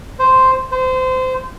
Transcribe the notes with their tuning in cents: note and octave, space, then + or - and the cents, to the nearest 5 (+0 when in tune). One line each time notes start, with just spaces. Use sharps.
C5 -5
C5 -25